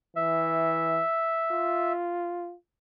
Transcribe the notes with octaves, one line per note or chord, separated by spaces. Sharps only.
E3 E5
F4